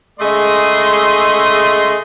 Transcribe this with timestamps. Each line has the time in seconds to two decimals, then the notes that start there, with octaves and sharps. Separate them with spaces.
0.20 C#3 G#3 A3 G#4 D#5 C6